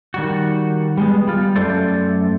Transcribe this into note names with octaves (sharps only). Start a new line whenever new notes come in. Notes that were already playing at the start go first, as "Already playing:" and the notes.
D#3 G3 F#4
G3 G#3 B3
G3 F4
F#2 A3 A4 C5 D5